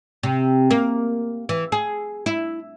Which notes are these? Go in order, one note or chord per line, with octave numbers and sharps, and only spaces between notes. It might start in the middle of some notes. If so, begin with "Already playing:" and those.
C3
A#3
E3
G#4
E4